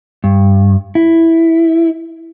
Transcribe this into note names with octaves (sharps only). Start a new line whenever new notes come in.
G2
E4